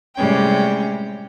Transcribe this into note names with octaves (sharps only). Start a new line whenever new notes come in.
A2 C3 G3 G#3 C#4 G5